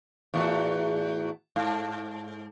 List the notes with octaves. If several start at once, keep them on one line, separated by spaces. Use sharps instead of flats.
E2 A2 F#4
G#2